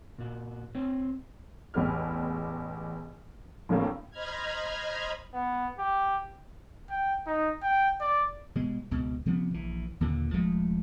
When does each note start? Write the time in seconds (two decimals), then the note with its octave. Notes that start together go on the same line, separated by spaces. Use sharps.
0.18 A#2 F#4
0.75 C4 C5 C#5
1.74 A1 E2 B3 G4 F6
3.69 A#1 A2 C#3 A#3 C4
4.10 C5 D#5 A#5 B5 F6 G#6
5.34 B3
5.79 G4
6.90 G5
7.26 D#4
7.62 G5
8.00 D5
8.55 B2 G3 G#3
8.91 C#2 B2
9.26 C3 F3 G3 B3
9.54 A#1 E3
10.00 D#2 A#2 D3
10.34 D#1 F3 G#3 A3